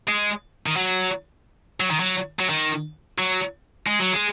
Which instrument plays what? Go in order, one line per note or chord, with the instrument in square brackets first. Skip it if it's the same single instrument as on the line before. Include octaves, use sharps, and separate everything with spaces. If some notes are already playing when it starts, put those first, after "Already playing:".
[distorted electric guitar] G#3
D#3
F#3
F#3
D#3
F#3
F#3
D#3
F#3
G#3
F#3
G#3